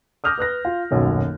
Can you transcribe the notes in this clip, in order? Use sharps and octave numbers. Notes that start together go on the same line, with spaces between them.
D6 D#6 F6 G6 A#6
B4 D#6 F#6 A#6
F4
D#1 B1 F#2